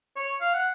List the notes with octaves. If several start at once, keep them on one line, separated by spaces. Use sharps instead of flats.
C#5
F5
F#5